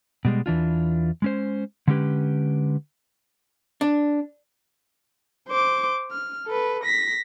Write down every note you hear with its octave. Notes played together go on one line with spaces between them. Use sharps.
B2 G3 G#3
E2 E3 D4 F4
G#3 C#4 C5
D3 G#3 A3 C#4 G4 B4
D4
C5 D6
F6
A4 B4
A#6 B6